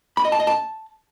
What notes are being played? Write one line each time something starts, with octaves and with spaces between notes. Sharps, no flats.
B5
D#5
A5
D#5
A5